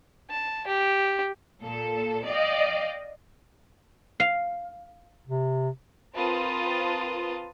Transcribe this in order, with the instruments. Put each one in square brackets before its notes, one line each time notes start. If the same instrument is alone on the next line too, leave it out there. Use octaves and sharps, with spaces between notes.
[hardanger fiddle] A5
G4
[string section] A#2 A4
D5 D#5 F5 G5
[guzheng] F5
[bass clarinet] C3
[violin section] C4 F4 A#4 B4 A5 D#6